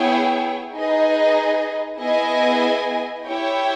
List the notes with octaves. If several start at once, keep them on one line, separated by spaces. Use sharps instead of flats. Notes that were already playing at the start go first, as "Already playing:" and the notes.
Already playing: B3 E4 G#4 C#5 G5
D#4 G#4 B4 D#5
B3 E4 G#4 D#5 G#5
E4 G4 C#5 G5